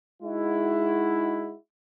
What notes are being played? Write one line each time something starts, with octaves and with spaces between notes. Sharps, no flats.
G#3 D#4 E4 F#4